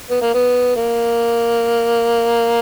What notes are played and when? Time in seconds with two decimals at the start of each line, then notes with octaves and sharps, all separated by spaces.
0.10 B3
0.22 A#3
0.34 B3
0.76 A#3